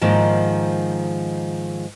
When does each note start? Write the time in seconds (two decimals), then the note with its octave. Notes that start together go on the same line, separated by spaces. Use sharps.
0.01 G#2 D#3 F3 A#3